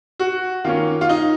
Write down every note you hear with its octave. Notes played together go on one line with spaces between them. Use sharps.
F#4
D#3 A#3 C#4 F4
F4
D#4